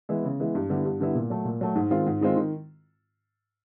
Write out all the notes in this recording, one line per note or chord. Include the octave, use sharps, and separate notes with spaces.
E3 G#3 B3 E4
C#3
E3 G#3 B3 E4
G2
D3 G3 B3 E4
G2
D3 G3 B3 E4
A#2
F#3 A3
A#2
F#3 A3
G#2
D#3 G#3 C4 F4
G#2
D#3 G#3 C4 F4
D#3